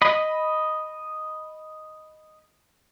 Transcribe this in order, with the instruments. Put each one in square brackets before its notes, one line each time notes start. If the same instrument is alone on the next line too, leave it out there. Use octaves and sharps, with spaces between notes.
[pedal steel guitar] D#5 B5